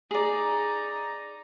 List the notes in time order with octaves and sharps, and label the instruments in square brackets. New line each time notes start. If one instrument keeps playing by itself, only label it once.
[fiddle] D#4 A#5 [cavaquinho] G#4 D5